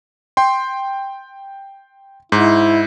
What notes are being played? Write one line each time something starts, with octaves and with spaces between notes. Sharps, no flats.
G5 C6
G#2 E4